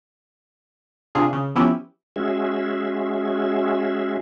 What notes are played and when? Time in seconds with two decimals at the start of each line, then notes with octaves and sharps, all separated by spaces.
1.15 C3 D4 F4 G#4
1.33 C#3
1.55 F3 B3 C#4 E4 G4
2.16 G#3 C#4 F#4 G#4 E5